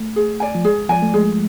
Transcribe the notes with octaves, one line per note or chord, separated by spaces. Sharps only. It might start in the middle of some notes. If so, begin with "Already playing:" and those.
Already playing: A3
G#4
D5 G#5
F3
G#3 G#4
F3 D5 G#5
A3
G#3 G#4